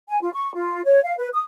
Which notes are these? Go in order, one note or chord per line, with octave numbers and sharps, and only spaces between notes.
G#5
F4
C#6
F4
C#5
F5
B4
D#6